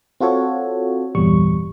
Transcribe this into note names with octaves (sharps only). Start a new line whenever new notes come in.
C4 F4 F#4 A4 C#5
G1 E2 A#2 G3 C#6